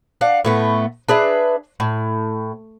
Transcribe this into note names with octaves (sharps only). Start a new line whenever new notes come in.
D4 F5 F#5
A2 A3 B3
D4 G#4 B4 E5
A2